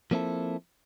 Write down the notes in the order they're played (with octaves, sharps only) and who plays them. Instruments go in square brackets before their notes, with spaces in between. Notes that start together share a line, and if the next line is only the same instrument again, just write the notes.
[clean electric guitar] F3 A#3 C4 E4 A4